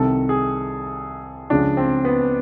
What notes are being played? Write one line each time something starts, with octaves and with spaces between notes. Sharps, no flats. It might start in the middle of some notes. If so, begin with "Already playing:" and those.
Already playing: C2 C3 D#3 A4
G#4
C#2 C#3 F3 D4
C4
B3